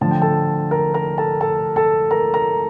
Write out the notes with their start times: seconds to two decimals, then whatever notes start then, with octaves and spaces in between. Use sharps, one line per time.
0.01 D3 F3 A3 A5
0.11 G5
0.22 A4 A5
0.71 A#4 A#5
0.94 A#4 A#5
1.18 A4 A5
1.41 A4 A5
1.76 A4 A5
2.11 A#4 A#5
2.34 A#4 A#5